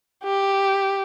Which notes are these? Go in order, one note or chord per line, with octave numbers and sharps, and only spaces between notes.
G4